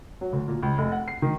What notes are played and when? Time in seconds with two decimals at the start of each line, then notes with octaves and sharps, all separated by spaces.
0.21 F#3
0.33 D2
0.48 A#2
0.63 C#2
0.78 F1
0.92 F#5
1.08 C7
1.22 D#3